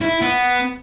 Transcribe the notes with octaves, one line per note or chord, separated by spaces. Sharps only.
E4
B3